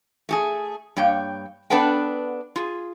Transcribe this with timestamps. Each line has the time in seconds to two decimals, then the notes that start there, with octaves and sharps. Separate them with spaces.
0.29 A3 G4 G#4
0.97 G2 A#3 C#5 G5
1.70 B3 D4 A4 B4 F#5 G5
2.56 F4 G#4